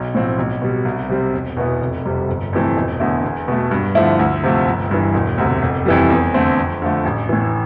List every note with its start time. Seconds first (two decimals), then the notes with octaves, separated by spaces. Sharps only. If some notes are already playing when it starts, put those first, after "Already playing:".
Already playing: B1
0.14 A2 F3 C4
0.38 B1
0.62 B2 G3
0.85 C2
1.09 C3 G3 C4
1.33 E1
1.57 E2 B2 B3 E4
1.81 F1
2.05 F2 C3 G3
2.29 G1
2.53 F2 C3 E3 A3
2.77 E1
3.00 E2 D3 A3 E4
3.24 E2
3.48 B2 A3
3.71 G2
3.95 D3 F3 A3 E4
4.19 D2
4.43 C3 F3 A3
4.67 G1
4.91 G2 E3
5.14 E1
5.38 D2 C3
5.62 F1
5.86 F2 E3 G3
6.10 E2
6.34 D3 A3 C4
6.58 F2
6.82 D3 F3 A3
7.05 A1
7.29 A2 E3